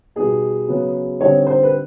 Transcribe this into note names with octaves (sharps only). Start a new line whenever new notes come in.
B2 G3 B3 D#4 G#4
C#3 F#3 B3
D3 G3 C4 D#4 C#5
C5
B4